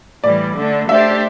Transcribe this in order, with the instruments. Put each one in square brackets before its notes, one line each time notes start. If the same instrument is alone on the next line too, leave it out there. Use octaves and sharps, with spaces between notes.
[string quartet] A2 E3 G3 [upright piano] D5
[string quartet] D3 A3 D4
[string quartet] A3 D4 G4 C5 [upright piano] E5